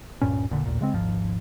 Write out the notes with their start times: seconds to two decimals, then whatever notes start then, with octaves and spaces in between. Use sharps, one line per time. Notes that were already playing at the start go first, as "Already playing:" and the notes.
0.21 D1 G2 A#2 C#4
0.50 E1 A#2 D3
0.66 A1 D#2 A#2
0.81 C#3 G#3 C4
0.94 D#1 G#1 G#2 F3